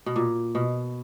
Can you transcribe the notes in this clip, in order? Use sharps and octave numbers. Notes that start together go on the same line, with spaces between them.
B2
A#2
B2